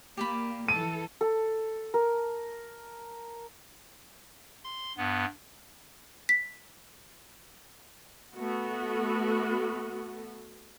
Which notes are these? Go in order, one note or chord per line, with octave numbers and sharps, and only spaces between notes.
A#3 G4 D5 B5
E3 A4 D#7
A4
A#4
C6
G2 B3
B6
A3 B3 F#4